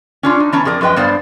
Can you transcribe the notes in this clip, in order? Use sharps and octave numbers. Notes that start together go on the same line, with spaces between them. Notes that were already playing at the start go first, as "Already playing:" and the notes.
C#4 D4 F4
D#4
E3 B3 C#4 A5 A#5
F2 G#4 A#4 D5
F#2 F3 B4 D#5 G5
G2 B3 C5 D5 F5